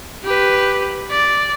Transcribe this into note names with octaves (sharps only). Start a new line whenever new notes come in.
G4 B4
D5